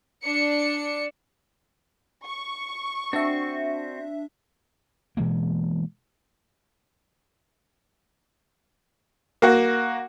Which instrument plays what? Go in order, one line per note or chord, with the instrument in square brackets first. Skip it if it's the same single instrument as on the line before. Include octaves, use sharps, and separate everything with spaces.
[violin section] D4 C#7
[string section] C#6
[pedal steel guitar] C4 F#4 [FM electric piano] D4 E5
[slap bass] B2 E3 G#3 A#3
[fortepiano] A#3 F#4